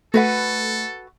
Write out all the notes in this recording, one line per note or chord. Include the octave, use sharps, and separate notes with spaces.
A3 F#4 A4 B4 F#5